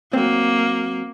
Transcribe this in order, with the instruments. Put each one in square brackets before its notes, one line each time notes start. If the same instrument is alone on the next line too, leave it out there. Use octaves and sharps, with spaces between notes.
[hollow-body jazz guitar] F#3 C4 [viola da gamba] A#3